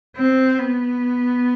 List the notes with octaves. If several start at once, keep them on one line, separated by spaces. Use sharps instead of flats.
C4
B3